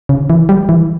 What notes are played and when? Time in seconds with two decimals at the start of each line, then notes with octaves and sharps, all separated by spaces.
0.09 C#3
0.30 E3
0.49 G3
0.69 E3